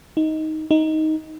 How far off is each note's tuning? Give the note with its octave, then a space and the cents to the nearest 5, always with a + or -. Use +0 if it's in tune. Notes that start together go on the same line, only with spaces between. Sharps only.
D#4 +10
D#4 +10